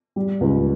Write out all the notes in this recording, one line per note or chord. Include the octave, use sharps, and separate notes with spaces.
G3
C#2